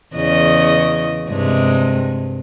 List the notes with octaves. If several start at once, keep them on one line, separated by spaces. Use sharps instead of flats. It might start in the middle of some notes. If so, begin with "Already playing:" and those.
E2 C#3 D#5
G2 C3 G#3